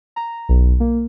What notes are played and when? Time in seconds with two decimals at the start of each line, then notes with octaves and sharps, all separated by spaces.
0.16 A#5
0.49 B1
0.80 A#3